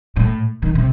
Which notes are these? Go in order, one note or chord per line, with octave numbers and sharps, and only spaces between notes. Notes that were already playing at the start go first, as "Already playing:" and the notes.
A2
D#3
C3